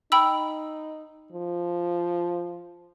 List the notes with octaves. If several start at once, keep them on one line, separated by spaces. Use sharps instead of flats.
D#4 G5 B5 E6
F3